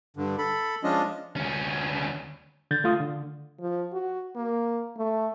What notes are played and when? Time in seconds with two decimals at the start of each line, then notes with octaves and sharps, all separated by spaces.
0.17 G2 D3
0.38 A4 B5
0.83 F3 G#3 C#4 D4 F4 D#5
1.36 D2 C#4
2.71 D3 G6 A6
2.84 A3 F4 D#6
3.00 D3
3.60 F3
3.93 F#4
4.35 A#3
4.97 A3